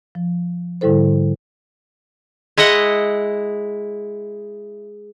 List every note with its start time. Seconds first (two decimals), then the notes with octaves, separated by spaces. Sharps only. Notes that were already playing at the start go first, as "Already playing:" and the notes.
0.15 F3
0.81 G#2 D3 G3 E4 A4 C5
2.58 G#3 E4 D#5 F#5